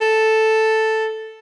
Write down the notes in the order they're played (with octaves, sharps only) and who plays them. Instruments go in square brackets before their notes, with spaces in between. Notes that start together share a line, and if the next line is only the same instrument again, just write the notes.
[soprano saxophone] A4